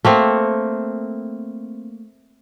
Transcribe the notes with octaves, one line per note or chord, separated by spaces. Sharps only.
A3 A#3 C4